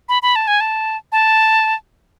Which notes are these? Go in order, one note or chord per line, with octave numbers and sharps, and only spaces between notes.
B5
B5
A5
G#5
A5
A5